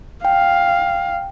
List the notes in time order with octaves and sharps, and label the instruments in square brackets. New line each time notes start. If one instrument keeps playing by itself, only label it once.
[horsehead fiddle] F5 [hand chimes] G5